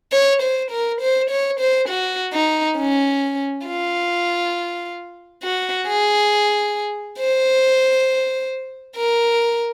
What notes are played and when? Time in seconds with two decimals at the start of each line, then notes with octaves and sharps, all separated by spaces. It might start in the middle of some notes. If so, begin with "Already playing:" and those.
0.12 C#5
0.42 C5
0.71 A#4
1.01 C5
1.30 C#5
1.60 C5
1.89 F#4
2.34 D#4
2.78 C#4
3.66 F4
5.43 F#4
5.87 G#4
7.20 C5
8.96 A#4